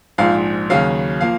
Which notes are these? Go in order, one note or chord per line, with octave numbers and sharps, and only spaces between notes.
A#1 G#2 F3 F5
D#2 C#3 F#3 F5
F3 A#3 F5